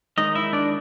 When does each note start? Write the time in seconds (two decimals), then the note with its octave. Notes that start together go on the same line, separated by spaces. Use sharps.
0.17 D#3 G#3 C#4 D#4 D#5
0.35 E4 E5
0.53 D4 D5